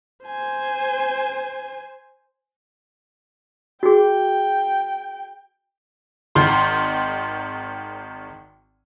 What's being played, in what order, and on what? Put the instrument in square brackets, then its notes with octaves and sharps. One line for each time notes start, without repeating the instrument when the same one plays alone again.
[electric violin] C5 G#5
[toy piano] F#4 G#4 [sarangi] G5
[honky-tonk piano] G#1 D#3 C6